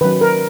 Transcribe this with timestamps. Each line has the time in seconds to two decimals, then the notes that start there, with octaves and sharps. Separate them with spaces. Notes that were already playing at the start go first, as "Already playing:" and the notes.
0.01 D#3 F#3 C#4 B4
0.21 A#4